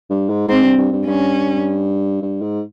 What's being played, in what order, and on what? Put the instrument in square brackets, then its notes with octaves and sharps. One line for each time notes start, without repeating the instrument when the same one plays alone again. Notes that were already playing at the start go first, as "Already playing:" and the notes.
[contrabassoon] G2
G#2
[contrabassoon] G#2 [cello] C4
[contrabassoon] G2
G2
G2
[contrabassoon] G2 [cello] C#4
[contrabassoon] G2
G#2